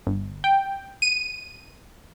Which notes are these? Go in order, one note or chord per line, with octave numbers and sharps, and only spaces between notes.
G1
G5
D#7